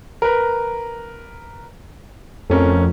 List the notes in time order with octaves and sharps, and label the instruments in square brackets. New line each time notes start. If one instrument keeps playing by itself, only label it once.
[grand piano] A#4 B4
[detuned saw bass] F2 [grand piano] A3 C#4 A#4